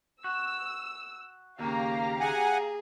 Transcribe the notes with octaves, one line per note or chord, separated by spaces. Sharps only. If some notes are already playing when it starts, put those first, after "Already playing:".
F#4 E6
D#2 C#3 A#3 G4 F5 A#5
G#4 F#5 G#5